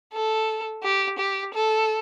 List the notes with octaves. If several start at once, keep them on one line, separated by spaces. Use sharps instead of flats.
A4
G4
G4
A4